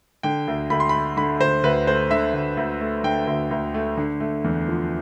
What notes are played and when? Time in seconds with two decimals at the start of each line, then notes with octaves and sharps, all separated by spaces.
0.23 D3 G5
0.48 D2
0.70 D2 B5
0.80 C6
0.89 B5
0.94 A3
1.17 D3 B5
1.40 D2 C5
1.64 D2 B4
1.87 A3 C5
2.10 D3 E5
2.34 D2
2.57 D2
2.81 A3
3.04 D3 G5
3.27 D2
3.51 D2
3.74 A3
3.97 D3
4.20 A3
4.44 E2
4.68 F3